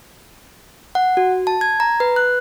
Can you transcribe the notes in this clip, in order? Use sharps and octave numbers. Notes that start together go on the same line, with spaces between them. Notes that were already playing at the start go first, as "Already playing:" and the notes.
F#5
F#4
A5
G#6
A#5
B4
F#6